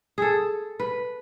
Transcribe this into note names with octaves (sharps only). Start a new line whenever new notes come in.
G#4 A4
B4